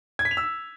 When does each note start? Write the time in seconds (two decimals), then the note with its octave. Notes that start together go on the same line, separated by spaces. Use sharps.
0.19 G#6
0.25 B6
0.31 F7
0.37 E6